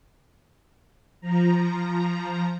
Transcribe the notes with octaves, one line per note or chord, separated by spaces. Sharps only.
F3 A#5